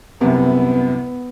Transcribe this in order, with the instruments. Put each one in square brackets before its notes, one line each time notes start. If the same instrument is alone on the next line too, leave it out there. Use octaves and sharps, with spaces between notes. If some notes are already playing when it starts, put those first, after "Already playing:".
[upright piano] C2 F#2 C3 [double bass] B3